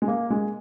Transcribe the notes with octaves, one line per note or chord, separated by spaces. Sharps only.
G#3
A#3
G#3